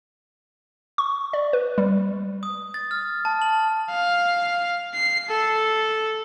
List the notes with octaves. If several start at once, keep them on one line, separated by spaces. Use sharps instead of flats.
C#6
D5
B4
G3
D#6
A6
F6
A5
F#7
F5
C7
A4